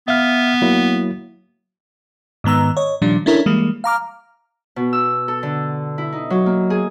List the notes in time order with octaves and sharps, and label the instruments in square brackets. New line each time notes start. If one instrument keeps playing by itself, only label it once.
[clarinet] B3 [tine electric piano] E5 F5 F6
[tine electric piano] F#3 A#3 E4
[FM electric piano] G#2 D#3 B3 A#5 E6
C#5 D#5
A#2 D#3 F3 G3 D4
C#4 D4 E4 A4 A#4 C#5
E3 G3 G#3 A#3
F5 A#5 D6 F6
[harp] B2
E6
A4
D3
E4
D#4
F#3
A#3
G#4